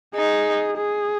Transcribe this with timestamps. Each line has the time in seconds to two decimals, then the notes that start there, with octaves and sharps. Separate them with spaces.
0.15 D#4 G#4
0.77 G#4